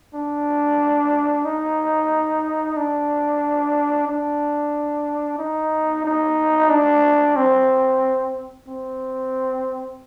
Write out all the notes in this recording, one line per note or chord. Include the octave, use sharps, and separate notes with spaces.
D4
D#4
D4
D4
D#4
D#4
D4
C4
C4